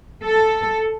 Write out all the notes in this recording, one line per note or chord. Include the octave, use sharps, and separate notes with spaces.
A4